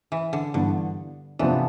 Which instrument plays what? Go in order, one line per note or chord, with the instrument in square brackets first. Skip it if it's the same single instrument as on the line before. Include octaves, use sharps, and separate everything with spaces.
[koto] E3
D3
[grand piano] G2 E3 B3 [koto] D3
[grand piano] C3 F3 B3 D4 [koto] E3